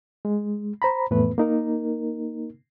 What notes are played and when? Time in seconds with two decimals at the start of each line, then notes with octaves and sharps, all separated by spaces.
0.25 G#3
0.82 C5 A#5 B5
1.11 F2 A2 E3 A3 B3 B4
1.38 A#3 D#4 A#4